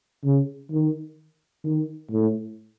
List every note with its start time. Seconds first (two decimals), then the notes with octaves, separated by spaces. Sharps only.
0.24 C#3
0.71 D#3
1.64 D#3
2.11 A2